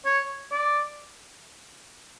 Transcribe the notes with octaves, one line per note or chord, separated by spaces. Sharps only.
C#5
D5